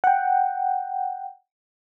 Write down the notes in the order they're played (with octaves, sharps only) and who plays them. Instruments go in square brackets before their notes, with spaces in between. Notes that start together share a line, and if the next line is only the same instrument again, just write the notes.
[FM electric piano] F#5 G5